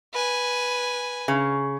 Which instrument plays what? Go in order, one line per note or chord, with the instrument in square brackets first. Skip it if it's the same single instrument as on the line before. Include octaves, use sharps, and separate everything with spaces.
[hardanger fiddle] B4 G#5
[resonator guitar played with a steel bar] C#3